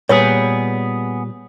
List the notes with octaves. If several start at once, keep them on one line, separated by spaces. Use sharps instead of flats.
A#2 G3 B3 G#4 B4 C#5